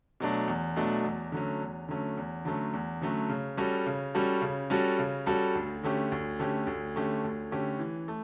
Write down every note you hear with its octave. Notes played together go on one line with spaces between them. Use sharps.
B2 F#3 A3 D4
E2
B2 F#3 A3 D4
E2
D3 F#3 A3 C#4
E2
D3 F#3 A3 C#4
E2
D3 F#3 A3 C#4
E2
D3 F#3 A3 C#4
C#3
G3 C#4 F#4 A4
C#3
G3 C#4 F#4 A4
C#3
G3 C#4 F#4 A4
C#3
G3 C#4 F#4 A4
D2
D3 A3 C#4 G4
D2
D3 A3 C#4 G4
D2
D3 A3 C#4 G4
D2
D3 A3 C#4 G4
E3
A3